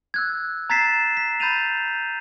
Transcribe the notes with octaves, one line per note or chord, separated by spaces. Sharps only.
E6 F#6 G#6
A#5 G#6 A6 B6 C7 E7
B6
B5 G6 A6 D#7 F7